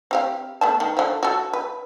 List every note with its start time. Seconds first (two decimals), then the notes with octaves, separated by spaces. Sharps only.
0.11 C4 G4 F5
0.61 A3 B3 A5
0.80 D#3
0.97 D3 F3
1.23 F#4 A4
1.54 B4